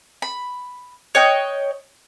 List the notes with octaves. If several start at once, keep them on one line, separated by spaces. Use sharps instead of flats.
B5
C#5 D#5 G5 F#6